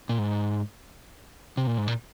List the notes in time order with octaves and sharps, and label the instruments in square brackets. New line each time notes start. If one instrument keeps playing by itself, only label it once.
[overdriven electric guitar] A#2
G#2
C3
A#2
G#2
A#2